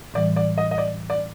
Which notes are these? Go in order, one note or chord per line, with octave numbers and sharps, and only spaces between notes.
A2 E3 G3 D5
D5
D#5
D#5
D5
D5